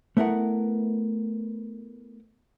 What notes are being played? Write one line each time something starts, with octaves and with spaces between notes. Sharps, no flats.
A3 B3 E4 A#4 F#5